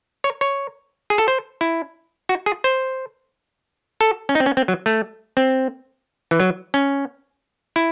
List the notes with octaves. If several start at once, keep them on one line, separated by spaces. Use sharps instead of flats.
C#5
C#5
G#4
A4
C5
E4
F#4
G#4
C5
A4
C#4
D#4
C4
C#4
C4
F#3
A3
C4
E3
F#3
C#4
E4